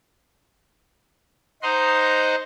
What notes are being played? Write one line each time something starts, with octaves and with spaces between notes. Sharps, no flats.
D#4 C5 D#5 F#5 A#5 C6